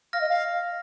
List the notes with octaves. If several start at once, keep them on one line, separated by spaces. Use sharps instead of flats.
F5 F6 A#6
D#5
F5